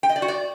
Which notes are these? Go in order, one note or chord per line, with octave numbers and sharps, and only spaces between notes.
G5
D#5
D5
F#4
D5